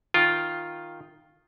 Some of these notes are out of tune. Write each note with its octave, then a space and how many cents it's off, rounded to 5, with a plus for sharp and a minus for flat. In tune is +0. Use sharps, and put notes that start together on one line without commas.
D#3 +0 F4 +0 G5 +0